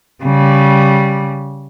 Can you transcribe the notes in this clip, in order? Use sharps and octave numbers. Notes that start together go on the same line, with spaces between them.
C#3 G3